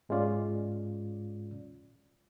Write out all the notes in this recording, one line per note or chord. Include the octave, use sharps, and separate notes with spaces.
G#2 G#3 C#4 F4 D5